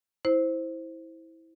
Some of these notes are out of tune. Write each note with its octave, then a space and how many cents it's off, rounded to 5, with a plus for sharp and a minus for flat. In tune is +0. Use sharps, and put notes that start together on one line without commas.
E4 -15 C5 +0